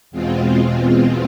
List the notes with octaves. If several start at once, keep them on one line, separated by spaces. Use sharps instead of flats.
E2 B2 G#3 C4 F4